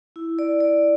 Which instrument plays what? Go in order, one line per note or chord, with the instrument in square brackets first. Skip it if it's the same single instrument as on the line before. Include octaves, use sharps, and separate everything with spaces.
[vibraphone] E4
D5
D5